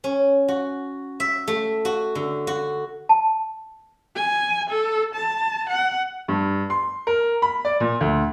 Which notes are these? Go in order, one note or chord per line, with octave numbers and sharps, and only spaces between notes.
C#4
F#4
E5
A3
F#4
D3
F#4
A5
G#5
A4
A5
F#5
G2
C6
A#4
B5
D5
A#2
D2